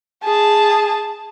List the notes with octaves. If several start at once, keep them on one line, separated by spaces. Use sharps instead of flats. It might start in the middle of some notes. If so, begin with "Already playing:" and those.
G#4 A5